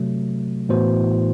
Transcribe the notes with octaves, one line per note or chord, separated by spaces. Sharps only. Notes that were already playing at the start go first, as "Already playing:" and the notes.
Already playing: C3 F#3 A3
A2 E3 B3 F#4 C5